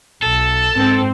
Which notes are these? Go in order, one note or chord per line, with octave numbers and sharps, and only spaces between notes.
B1 A4 A5
G#2 C4